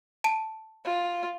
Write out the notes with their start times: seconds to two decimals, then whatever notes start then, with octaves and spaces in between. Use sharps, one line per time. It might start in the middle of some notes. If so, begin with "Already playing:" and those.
0.24 A5 D7 D#7
0.85 F4